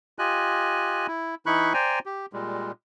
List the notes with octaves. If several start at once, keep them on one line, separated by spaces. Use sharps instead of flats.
F4 G4 D#5 G#5 F#6
E4
E3 D#4 E4 B5 C#6 F#6
C5 D5 G5 G#5 A#5
G4
A#2 G3 G#3